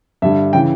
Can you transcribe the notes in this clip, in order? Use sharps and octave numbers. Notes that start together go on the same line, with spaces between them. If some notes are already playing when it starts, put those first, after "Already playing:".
G2 D3 G3 E5
C#3 E3 G5